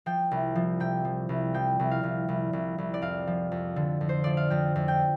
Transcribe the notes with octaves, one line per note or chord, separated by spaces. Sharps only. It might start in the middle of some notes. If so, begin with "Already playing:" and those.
F3 G5
C2
F3
C3 G5
F3
C2
F3 G5
C2
F5
C2
C2
C2
C2
D5
F2 F5
F3
F2
D3
F2
C5
F3 D5
F5
F2 G5
F2
G5